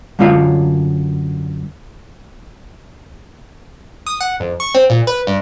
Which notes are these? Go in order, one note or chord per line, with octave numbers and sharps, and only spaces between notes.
F#2 D3 A#3 F4 C#5 F5
D#6
F#5
F2
C#6
C4
A#2
B4
G2